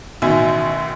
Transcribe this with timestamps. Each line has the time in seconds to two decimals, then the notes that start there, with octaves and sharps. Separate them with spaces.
0.22 A1 B2 D#3 E5 G#5